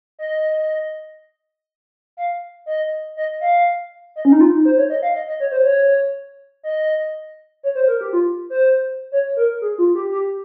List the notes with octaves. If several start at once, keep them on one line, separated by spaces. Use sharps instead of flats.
D#5
F5
D#5
D#5
F5
D#5
C#4
D#4
F4
D#4
C5
C#5
D#5
F5
D#5
D#5
C#5
C5
C#5
D#5
C#5
C5
A#4
G4
F4
C5
C#5
A#4
G#4
F4
G4
G4